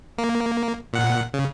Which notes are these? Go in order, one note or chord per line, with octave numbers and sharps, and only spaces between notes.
A#3
A#2 F#5
C#3